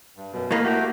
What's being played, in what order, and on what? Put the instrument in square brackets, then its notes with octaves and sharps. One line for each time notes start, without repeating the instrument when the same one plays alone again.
[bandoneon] G2
F#2 B2
[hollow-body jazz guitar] A2 A#3 [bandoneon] D#5 F5 B5
[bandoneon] A3 F#4 G4